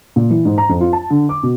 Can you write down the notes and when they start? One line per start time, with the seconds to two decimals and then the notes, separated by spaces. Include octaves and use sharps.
0.16 A#2
0.30 E3
0.45 G#2
0.58 A#5
0.69 F2
0.81 F4
0.93 A5
1.10 D3
1.29 D6
1.43 B2